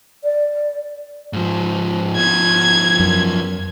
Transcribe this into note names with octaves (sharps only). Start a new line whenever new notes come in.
D5
G#2 F3
F3 B3 G#6
F#2